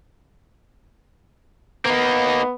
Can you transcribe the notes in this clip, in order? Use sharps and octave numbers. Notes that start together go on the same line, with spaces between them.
A#3 B3 D#4